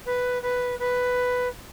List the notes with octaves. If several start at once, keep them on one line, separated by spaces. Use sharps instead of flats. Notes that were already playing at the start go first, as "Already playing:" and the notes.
B4
B4
B4